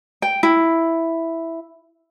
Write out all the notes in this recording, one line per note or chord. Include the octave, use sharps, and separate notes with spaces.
G5
E4